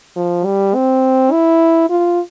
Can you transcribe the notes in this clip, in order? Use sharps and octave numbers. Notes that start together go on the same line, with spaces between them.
F3
G3
C4
E4
F4